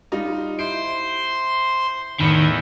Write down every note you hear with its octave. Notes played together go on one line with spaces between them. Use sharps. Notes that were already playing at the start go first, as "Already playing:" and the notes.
G3 D#4 F4
E4 C5 C6 D7
E2 A2 D#3 C#7